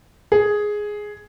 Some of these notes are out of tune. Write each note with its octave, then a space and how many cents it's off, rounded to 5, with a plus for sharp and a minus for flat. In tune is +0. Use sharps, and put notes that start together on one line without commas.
G#4 +5